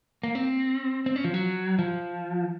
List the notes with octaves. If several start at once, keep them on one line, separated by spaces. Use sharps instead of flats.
A#3
C4
C4
C#4
F3
F#3
F3